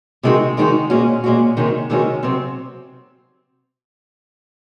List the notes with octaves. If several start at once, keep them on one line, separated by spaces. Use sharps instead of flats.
C3 D#3 G#3 D#4 F#4
C3 D#3 G#3 D#4 F#4
A#2 G#3 C#4 F#4
A#2 G#3 C#4 F#4
C3 D#3 G#3 C#4 F#4
C3 D#3 G#3 C#4 F#4
C3 F#3 C4